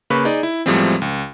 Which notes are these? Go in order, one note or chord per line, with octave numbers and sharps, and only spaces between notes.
C#3 A#3 B4 B5 C#6
D#4 G#4 D5
E4
E2 A2 F3 G3 G#3 C4
C#2